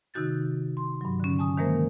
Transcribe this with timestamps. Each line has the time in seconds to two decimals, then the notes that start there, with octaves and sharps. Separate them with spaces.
0.14 C3 D#3 D#4 F#4 G6 A6
0.77 C6
1.01 G2 F#3
1.20 D3 C#4
1.39 G#5 A5 D#6
1.57 D#3 E3 G#3 A#3 A#4 C5